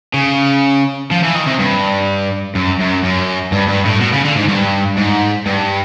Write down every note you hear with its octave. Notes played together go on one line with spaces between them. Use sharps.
C#3
F3
E3
D#3
C3
G2
F#2
F#2
F#2
G2
G2
A2
B2
C#3
D3
G#2
G2
G#2
G2